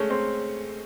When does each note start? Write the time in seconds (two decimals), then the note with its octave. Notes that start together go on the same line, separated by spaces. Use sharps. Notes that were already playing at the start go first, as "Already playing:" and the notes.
Already playing: G#3 A3 C#4
0.10 C4